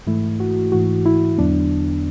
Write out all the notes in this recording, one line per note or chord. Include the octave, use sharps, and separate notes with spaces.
G#2 E3 A3 E4
F#4
G#2 E3 A3 F#4
E4
E2 D3 F#3 B3 D4